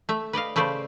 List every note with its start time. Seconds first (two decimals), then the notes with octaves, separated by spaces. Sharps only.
0.09 A3 E5
0.33 B4 D5 D#5 F5
0.56 C#3 A3 B4 C5 D5